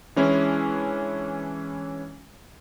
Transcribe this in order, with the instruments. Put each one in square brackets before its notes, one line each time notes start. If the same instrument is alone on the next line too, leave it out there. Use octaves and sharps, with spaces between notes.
[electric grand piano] E3 G#3 C#4 D4 E4